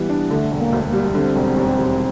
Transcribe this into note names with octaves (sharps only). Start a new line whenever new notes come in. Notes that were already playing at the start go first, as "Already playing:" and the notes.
Already playing: E3 G3 B3
D4
D3 A3
E1
A#3
D2
A#3
G3
D3 C4
E1
D#2
E1